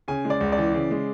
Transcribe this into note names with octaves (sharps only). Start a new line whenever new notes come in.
C#3 G#5
G#3
D5
C#2
D5
E3
C#3
G#3